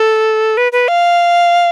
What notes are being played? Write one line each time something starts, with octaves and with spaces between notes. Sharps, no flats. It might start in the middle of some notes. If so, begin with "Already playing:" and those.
Already playing: A4
B4
B4
F5